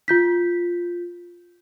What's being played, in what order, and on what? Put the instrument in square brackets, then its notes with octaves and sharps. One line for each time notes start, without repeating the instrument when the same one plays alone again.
[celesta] F4 G6 B6